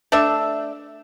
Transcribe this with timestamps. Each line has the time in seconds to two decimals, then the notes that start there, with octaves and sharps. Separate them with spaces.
0.12 A3 D4 E5